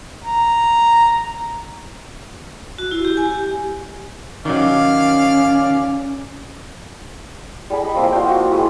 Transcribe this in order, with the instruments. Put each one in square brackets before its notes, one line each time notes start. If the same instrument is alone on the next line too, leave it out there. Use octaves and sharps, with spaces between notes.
[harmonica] A#5
[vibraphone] F#4
E4
G4
G#5
G4
[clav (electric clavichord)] D#3 F#3 [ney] C#4 [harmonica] D5 F5
[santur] G3 G#4 G#5 B5
D#5
F3 A#3 C4
F4 F#4 F5 G5
F#4
G#3 E4 G4 C#6